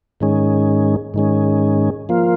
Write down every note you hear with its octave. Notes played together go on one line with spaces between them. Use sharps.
G#2 D#3 G#3 C#4
G#2 D#3 G#3 C#4
F3 A#3 F4